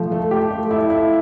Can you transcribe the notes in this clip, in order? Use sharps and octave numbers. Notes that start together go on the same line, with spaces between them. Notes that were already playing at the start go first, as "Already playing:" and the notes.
Already playing: F3 A3
A3
G4
A3
E4
E4